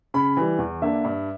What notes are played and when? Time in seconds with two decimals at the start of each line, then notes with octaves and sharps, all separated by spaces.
0.14 C#3 B5
0.37 E3 G3
0.58 E2
0.82 D3 A#3 D4 E5
1.05 G2